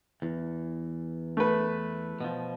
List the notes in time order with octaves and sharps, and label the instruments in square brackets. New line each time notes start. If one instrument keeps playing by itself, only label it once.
[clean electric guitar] E2
[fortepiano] A3 B4
[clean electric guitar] B2 F3